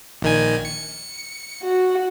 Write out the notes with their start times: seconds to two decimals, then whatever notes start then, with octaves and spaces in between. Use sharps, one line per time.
0.22 A#1 D#3 G#5
0.65 C#7
1.63 F#4